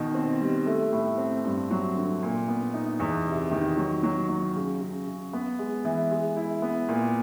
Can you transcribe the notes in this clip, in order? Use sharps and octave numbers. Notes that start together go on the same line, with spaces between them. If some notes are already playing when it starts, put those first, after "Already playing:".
Already playing: B2 D#3
C4
G3
A3
A2
C4
G2
F#3
D3
A#2
B3
D#4
E2
C3
D#3
F#3
F#3
F#3
C#3
C#3
C#3
B3
G#3
E3
G#3
E4
B3
A#2